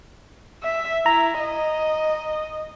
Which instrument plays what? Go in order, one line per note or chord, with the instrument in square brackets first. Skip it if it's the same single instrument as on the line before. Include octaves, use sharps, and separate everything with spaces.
[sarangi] E5
[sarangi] E4 [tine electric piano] A#5
[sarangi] D#5